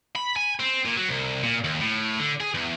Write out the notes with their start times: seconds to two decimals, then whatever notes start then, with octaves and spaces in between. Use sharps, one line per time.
0.16 B5
0.36 G#5
0.59 C4
0.85 A#2
0.97 F#3
1.09 C2
1.43 A#2
1.64 D#2
1.80 A2
2.19 D3
2.40 G#4
2.54 E2